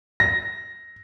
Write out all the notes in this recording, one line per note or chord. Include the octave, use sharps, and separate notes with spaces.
A#6